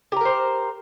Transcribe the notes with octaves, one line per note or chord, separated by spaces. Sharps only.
G4 A#4 C5 A#5